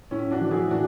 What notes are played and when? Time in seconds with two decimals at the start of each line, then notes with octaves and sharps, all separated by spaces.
0.11 A2 C#4 E4
0.31 D4 F#4
0.41 E3
0.51 E4 G#4
0.71 A2 D4 F#4